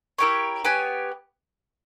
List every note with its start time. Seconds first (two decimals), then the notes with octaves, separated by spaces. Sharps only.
0.18 E4 G4 A#4 C#5
0.65 B3 G4 C#5 G#5